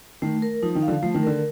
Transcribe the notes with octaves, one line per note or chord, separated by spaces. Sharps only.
D#3 A3
A#4
F3 D#4
D#3
F5
D3 F3
F3 A3
D#3
D3 A#4